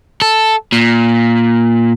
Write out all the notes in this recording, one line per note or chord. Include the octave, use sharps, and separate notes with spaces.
A4
A#2